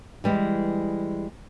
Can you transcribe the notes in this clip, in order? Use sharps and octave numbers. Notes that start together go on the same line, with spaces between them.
E3 G3 G#3